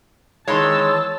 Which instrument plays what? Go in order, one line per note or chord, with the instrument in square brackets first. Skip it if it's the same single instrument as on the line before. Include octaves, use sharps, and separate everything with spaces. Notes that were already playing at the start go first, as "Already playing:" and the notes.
[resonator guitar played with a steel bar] D#3 E3 G#3 [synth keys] C#5 C6 [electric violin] A5 E6